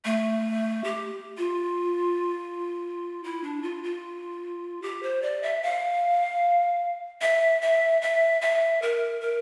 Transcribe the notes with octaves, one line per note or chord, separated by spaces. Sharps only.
A3
G4
F4
E4
D4
F4
F4
G4
C5
D5
E5
F5
E5
E5
E5
E5
A#4
A#4